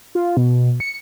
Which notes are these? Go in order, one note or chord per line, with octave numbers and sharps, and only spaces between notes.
F4
B2
C#7